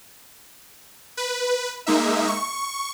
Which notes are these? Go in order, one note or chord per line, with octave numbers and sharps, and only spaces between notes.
B4
G#3 A#3 D#4 E5
C#6